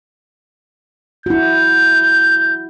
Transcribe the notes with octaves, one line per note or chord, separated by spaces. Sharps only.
E4 F#4 G6